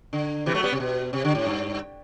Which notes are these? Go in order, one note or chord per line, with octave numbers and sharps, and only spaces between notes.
D3
C3 E3
F#3 A3
G3 B3
C3
B2
C3
D3
A2
G2